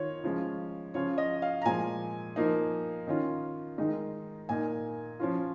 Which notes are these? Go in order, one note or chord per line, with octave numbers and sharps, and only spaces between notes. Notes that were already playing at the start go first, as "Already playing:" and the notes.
Already playing: D#3 F4 C#5
C#3 F3 G#3
C#3 F3 C#4 F4 C#5
D#5
F5
A#5
A#2 F3 G#3 G#5
F3 A#3 D#4
D#3 C#4 F4
D#3 G#3 D#4
A#2 A#3 D#4 G#5
F3 C#4 F4